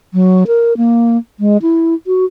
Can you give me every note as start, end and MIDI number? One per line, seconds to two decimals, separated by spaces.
0.14 0.44 54
0.47 0.73 70
0.77 1.17 58
1.40 1.58 56
1.62 1.94 64
2.07 2.25 66